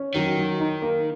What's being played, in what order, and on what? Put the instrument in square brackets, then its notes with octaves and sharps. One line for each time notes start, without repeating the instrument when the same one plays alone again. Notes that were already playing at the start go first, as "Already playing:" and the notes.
Already playing: [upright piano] C#4
[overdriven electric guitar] D#3 [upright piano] F#3
[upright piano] F#3
D#4
A#3